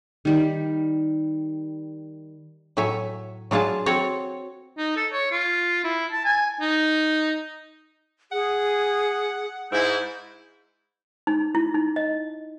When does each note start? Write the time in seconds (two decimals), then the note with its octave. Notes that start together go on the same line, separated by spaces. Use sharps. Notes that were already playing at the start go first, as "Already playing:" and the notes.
0.25 D#3 G3
2.77 A2 F#3 C#5 E5 G#5
3.51 F#3 D4 F4 G#4 A5
3.86 C4 F#4 A4 C#5
4.78 D#4
4.96 A4
5.12 C#5
5.31 F4
5.84 E4
6.12 A5
6.25 G#5
6.61 D#4
8.32 G#4 F#5
9.71 G#2 E4 G6
11.27 D#4
11.55 E4
11.74 D#4
11.96 D#5